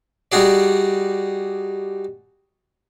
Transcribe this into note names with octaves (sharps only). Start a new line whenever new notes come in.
G3 D#4 F#4 G#4 D5